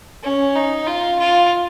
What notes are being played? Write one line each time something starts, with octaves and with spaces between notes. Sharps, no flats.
C#4
D#4
F4
F4